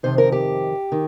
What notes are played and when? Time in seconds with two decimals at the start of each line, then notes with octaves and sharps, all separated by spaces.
0.03 F2 C3 D#3 C5
0.18 A#4
0.32 G4
0.92 D#3